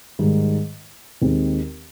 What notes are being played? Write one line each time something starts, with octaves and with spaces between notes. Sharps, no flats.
G#2 D#3 G3
D#2 D#3 G#3 C4